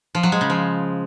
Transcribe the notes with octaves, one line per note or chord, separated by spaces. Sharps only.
F3
F#3
G#3
C#3
F3